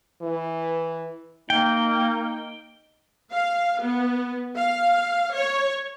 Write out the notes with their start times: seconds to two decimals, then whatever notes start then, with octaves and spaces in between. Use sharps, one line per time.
0.21 E3
1.50 A#3 D#4 G5
3.32 F5
3.81 B3
4.57 F5
5.34 C#5